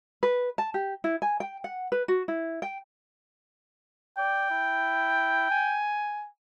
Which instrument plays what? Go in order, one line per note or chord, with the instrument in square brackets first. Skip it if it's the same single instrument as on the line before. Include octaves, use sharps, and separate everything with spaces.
[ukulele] B4
A5
G4
E4
G#5
G5
F#5
B4
F#4
E4
G5
[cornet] D5 [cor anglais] G5
[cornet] E4
G#5